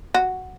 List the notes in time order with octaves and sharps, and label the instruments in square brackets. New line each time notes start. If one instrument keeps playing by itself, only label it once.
[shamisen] F#4